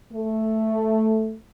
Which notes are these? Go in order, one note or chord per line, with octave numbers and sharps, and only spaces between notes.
A3